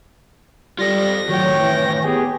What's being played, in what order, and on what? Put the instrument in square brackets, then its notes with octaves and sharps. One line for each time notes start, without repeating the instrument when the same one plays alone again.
[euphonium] G3 [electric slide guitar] F4 A4 [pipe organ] A#6
[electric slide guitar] A2 D#3 [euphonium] F#3 [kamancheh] C#5 G5
[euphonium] E3
[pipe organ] B3 G4 G#4